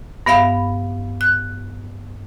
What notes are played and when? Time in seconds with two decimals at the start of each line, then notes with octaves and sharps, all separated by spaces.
0.26 G2 B3 E5 F5 B5
1.21 F#6